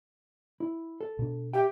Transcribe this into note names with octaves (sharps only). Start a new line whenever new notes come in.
E4
A4
B2 D4
G4 E5 G5